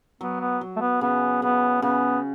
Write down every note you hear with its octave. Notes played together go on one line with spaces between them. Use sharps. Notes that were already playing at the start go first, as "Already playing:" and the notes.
F#3 B3
B3
F#3
A3
B3
C#3 B3
C#3 B3
C#3 B3